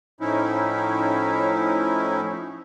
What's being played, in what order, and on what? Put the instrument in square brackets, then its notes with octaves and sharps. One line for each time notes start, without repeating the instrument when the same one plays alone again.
[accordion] A2 F3 C#4 D#4 E4